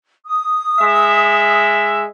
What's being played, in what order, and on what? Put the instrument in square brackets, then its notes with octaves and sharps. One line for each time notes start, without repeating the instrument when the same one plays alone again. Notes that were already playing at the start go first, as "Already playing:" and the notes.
[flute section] D#6
[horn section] G#3 E5